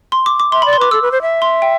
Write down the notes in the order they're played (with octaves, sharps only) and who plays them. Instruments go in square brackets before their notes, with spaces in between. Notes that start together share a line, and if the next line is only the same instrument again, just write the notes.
[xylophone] C6
D6
D6
[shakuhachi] E5 [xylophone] C6
[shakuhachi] D5 [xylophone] B5
[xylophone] C6
[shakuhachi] B4 [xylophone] D6
[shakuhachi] A4 [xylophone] E6
[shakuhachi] B4
C5
E5
[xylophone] C6
G5